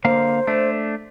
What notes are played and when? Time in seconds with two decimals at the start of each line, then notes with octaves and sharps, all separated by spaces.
0.05 D3 A#3 C5 F5
0.47 A3 D4